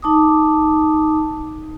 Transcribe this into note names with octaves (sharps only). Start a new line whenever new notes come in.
D#4 A5 D6 D#6